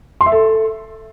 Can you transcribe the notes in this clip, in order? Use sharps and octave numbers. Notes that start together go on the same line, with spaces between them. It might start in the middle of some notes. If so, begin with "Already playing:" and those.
C6
E5
A4